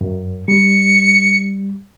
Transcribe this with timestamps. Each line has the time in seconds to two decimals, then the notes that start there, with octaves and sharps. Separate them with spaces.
0.01 F#2
0.48 G3 C#7